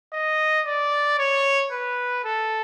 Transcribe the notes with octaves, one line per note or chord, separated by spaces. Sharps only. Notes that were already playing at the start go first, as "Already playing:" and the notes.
D#5
D5
C#5
B4
A4